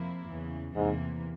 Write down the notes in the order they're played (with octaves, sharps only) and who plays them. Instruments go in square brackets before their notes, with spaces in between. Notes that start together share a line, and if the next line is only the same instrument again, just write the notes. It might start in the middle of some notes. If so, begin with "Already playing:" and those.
Already playing: [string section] F2 C3 F3 A#3 E4
E2 C#3 E3
[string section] E2 C3 E3 A#3 [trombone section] G#2